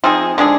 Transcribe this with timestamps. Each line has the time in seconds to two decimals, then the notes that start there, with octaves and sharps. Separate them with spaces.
0.04 F3 C4 D#4 G#4
0.38 D3 G#3 D4 G#4